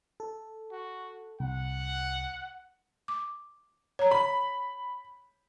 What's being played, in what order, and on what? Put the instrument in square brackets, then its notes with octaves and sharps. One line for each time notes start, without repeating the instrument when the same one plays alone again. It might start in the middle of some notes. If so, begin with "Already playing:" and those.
[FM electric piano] A4
[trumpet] F#4
[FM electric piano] C2 [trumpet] F#5
[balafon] D6
C#5 A#5
[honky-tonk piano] B5